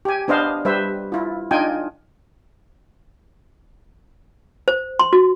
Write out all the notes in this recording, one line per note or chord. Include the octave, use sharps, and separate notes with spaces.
G4 G#5
B3 D4 C5 D#5 F5
G3 B4 C5 E5
E4 F4
D4 D#4 F4 G5 G#5
C5
C6
F#4